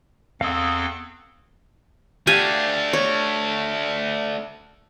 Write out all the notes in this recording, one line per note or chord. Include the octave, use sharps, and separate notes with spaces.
E2 C4 A4 F5 D#6
A3 D4 G4 F5 G#5
C#5